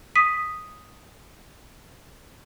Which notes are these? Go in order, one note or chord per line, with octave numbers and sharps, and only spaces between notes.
D#6 B6 D#7